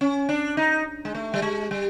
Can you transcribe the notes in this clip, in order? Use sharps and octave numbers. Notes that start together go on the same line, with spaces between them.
C#4
D4
D#4
G#3
A3
G3
G#3
G3